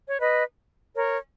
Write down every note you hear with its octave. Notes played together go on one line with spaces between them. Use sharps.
C#5
B4 D#5
A#4 C#5